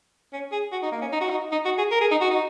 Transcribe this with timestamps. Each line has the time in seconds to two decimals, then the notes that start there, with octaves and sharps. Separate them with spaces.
0.33 C#4
0.52 G#4
0.72 F#4
0.82 D#4
0.92 A#3
1.01 C#4
1.12 D#4
1.21 F#4
1.29 D#4
1.51 D#4
1.65 F#4
1.78 G#4
1.91 A#4
2.01 G#4
2.11 D#4
2.21 F#4
2.30 D#4